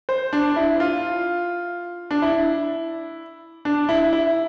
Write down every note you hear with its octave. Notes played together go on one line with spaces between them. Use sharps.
C5
D4
E4
F4
D4
E4
D4
E4
E4